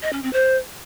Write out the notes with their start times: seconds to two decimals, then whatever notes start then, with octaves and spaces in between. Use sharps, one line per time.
0.03 D#5
0.13 C#4
0.23 C4
0.33 C5